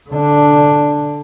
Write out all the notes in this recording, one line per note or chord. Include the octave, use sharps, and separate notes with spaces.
D3 D4